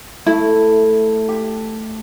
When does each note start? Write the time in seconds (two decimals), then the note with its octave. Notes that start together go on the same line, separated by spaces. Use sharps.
0.26 A3 E4
1.29 G4